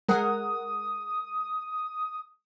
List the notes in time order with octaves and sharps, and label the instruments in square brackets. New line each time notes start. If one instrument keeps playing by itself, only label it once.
[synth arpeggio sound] G#3 A#4 F#5 [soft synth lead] D#6